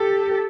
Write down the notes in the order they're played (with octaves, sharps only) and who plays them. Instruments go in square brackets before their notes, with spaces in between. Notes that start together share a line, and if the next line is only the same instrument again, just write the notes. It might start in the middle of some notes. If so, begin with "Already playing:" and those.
Already playing: [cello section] G4 A4